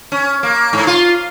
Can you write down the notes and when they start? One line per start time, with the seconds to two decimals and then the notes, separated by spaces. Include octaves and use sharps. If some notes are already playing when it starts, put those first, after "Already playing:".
0.12 C#4
0.43 A#3
0.73 G#2
0.87 F4